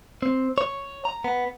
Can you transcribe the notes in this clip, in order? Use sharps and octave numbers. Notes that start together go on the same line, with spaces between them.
C4
C#5
A#5
B3